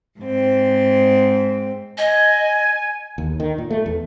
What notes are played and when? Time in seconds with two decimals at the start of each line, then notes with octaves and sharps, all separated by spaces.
0.19 G#2 C4
1.98 D#5 G#5
3.18 D#2
3.40 D#3
3.58 A#2
3.71 A3
3.86 E2